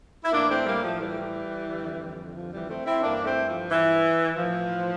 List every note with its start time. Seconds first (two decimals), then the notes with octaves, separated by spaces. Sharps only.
0.24 E4
0.32 A2 E3 A#3 D4
0.49 A3 C4
0.66 G3 A#3
0.83 F3 A3
1.00 E3 G3
1.68 F2 D3
2.34 F3
2.51 E3 G3
2.68 A3 C4
2.85 C4 E4
3.02 G2 E3 A#3 D4
3.24 A3 C4
3.46 F3
3.70 E3
4.36 A2 E3 F3